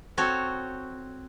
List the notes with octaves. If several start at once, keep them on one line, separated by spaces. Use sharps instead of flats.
C4 F#4 A4 C#5